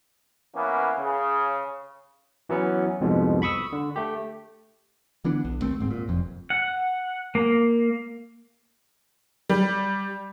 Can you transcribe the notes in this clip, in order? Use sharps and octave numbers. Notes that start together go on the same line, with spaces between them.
E3 A#3 B3 C#4
C#3
E3 F#3 B3 C#4
C2 F2 G#2 B2
B5 C#6 D#6 E6
D3
A3 G4
D3 E3 B3 D4
B1
D#2 A3 C4
D1 G#2 C4
A#2
F1 F2
F#5
A#3
G3